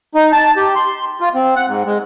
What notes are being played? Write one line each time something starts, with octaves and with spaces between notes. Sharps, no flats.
D#4
A5
G4
C6
F4
C4
F#5
G#2
G#3